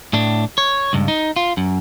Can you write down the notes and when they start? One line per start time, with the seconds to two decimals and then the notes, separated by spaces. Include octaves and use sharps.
0.13 A2 D4
0.58 C#5
0.93 C#2 G2
1.08 D#4
1.36 F4
1.57 F#2